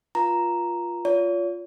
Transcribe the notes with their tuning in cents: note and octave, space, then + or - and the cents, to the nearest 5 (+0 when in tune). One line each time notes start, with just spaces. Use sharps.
F4 +0 B4 -45 A#5 +0
F4 +0 C#5 +40